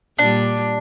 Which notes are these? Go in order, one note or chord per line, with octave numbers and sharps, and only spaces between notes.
A#2 G3 D4